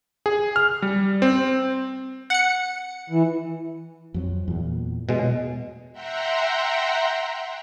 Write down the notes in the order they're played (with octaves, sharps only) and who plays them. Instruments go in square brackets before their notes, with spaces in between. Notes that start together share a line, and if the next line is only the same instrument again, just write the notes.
[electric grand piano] G#4
F6
G3
C4
[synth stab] F#5 C#7
[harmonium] E3
[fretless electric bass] F2 F#3 C4
E2 A#2
[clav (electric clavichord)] B2 G#3
[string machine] E5 F#5 G5 A#5 C6